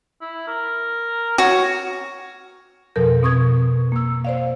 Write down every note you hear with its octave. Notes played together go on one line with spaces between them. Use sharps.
E4
A#4
F#4 C#5
F2 B2 F3 A4 A#4 G6
B2 C4 C#6 D#6 G#6
A#3 E6
C5 D5 F5